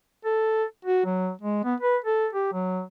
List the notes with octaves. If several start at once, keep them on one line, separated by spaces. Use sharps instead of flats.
A4
F#4
F#3
G#3
B3
B4
A4
G4
F#3